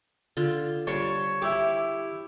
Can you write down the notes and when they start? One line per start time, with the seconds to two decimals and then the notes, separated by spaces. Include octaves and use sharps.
0.37 D3 F4
0.87 G3 C5 C#5 A5
1.42 E4 G4 D6